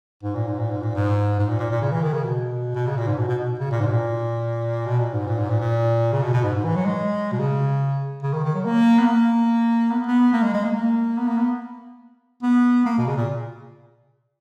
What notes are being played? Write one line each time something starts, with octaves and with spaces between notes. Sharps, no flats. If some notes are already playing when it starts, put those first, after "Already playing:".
G#2
A#2
G#2
A#2
G#2
A#2
G#2
G#2
A#2
A#2
A#2
C#3
E3
D#3
C#3
B2
B2
C#3
A#2
G#2
B2
B2
B2
C#3
A#2
G#2
B2
A#2
B2
A#2
G#2
A#2
G#2
A#2
A#2
C#3
B2
B2
G#2
G#2
E3
F#3
G#3
B2
C#3
C#3
D#3
D#3
F#3
A#3
B3
A#3
B3
B3
A#3
G#3
G#3
A#3
A#3
B3
A#3
B3
B3
A#3
B2
C#3
A#2